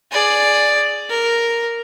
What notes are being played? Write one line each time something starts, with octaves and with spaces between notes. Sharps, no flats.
G#4 D5
A#4